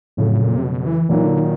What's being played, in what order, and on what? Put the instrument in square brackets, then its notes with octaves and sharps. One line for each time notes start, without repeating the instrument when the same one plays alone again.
[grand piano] F2 C#3 F#3 A3 [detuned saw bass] A2
[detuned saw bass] A#2
C3
B2
E3
[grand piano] A#2 F#3 A#3 D#4 [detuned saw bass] E3
[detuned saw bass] D3
D#3